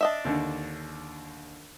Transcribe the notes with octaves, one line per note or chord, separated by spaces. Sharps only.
D4 D#5 E5
D#2 D3